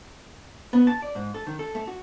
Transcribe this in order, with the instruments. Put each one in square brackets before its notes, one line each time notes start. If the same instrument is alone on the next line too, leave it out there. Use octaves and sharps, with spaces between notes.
[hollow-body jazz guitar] B3
A5
D5
G#2
A4
D#3
A4
A3
F#4